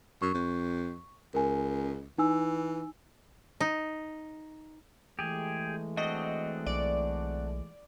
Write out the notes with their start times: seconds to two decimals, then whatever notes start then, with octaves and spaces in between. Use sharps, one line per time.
0.22 F#2 C#6
0.34 F2
1.34 C#2 A#4 G#5
2.18 E3 D#4 G#5 E6
3.60 D#4
5.19 E3 G#3 A3 G4 G#4
5.97 C4 D4 F#4 D#5
6.67 B1 D5